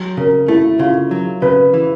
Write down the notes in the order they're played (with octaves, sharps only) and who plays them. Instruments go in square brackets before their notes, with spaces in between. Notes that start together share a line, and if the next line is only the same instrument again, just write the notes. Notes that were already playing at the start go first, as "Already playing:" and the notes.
Already playing: [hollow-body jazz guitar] F#3
[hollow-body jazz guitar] C#3 [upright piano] A#4
[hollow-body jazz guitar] A3 [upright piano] E4
[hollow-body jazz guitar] C#3 [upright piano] F4
[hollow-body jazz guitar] F#3
[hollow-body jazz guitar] C#3 [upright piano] B4
[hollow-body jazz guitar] E3